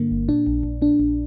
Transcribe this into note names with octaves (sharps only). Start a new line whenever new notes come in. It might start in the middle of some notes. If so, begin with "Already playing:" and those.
Already playing: G2 D3 A#3
G1
A#2 D4
A#1
A#1
A#2 D4
A#1